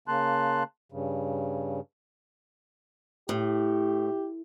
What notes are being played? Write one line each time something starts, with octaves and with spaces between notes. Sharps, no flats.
C#3 A#3 A5 C6 F#6
G2 C#3
A2 G4